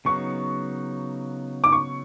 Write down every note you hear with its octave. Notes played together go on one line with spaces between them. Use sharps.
C#3 F#3 B3 D#4 C#6
D6
C#6